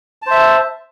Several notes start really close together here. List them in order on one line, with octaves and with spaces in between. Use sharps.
A5 C5 E5